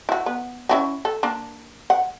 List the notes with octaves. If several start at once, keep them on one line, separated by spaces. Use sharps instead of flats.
E4 F#4
B3
C#4 E4 F#4
A4
A#3 D4
F#5